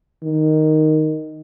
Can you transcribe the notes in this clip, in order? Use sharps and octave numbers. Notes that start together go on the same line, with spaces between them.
D#3